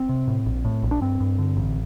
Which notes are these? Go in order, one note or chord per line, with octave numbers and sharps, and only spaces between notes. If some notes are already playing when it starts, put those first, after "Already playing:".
Already playing: C4
C3
A2
A#1
A2
A#1
D4
G2 C4
G2
D3
A1